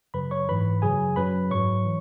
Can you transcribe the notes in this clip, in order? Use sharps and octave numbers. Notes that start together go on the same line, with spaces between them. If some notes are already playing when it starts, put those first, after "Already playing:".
F#2 C#3 F#3 B4 B5
C#5 C#6
G#2 E3 B4 B5
F#2 C#3 F#3 G#4 G#5
F#2 F#3 B4 B5
G#2 F#3 C#5 C#6
E3